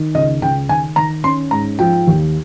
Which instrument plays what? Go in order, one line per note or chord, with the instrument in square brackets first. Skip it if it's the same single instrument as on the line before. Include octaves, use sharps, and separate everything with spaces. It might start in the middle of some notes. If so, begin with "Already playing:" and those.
Already playing: [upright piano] D#3
[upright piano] C#2 [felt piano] D#5
[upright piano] C#2 [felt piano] G5
[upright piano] D#3 [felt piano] G#5
[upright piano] D#3 [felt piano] A#5
[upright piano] C#4 [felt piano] C6
[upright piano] G#2 [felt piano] A#5
[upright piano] F3 [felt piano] G5
[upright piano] D#2